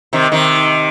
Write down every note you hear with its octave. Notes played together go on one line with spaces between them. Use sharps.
C3 D#3
C3 D#3